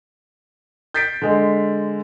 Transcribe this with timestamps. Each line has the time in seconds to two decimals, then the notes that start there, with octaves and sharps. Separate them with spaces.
0.94 G6 A6 B6 C7 D7
1.22 D3 G#3